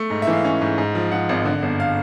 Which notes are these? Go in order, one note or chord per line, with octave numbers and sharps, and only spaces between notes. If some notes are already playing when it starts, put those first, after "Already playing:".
Already playing: A3
G#2
E5
E3
F5
C#4
G#2
G#2
F3
F3 F#5
G#1
D3
G1
F5